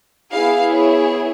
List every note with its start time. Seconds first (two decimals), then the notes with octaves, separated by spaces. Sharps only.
0.32 B3 E4 G#4 F5
0.72 C#5